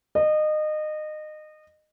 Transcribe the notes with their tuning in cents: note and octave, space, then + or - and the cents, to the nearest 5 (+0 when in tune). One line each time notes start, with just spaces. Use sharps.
D#5 -25